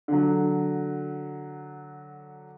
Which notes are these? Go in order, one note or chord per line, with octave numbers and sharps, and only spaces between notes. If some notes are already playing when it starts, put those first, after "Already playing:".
D3 F#3